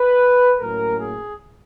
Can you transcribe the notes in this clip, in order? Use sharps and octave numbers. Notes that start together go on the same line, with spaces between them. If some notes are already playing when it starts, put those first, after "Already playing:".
Already playing: B4
A2 F#3 A#3 C#4 A#4
G#4